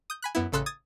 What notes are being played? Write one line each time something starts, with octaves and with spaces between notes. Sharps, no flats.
D#6 G6
G#5 B5 F#6
F#2 B3 E4
A1 C#3 A4 C6 E6 F#6
D#6 G#6 A6 D#7